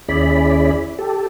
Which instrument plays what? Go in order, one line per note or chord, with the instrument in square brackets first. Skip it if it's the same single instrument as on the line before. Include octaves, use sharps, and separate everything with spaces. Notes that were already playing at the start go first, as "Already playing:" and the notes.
[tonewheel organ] D#2 C#4 E4 G#4 D5 B5
G4 A4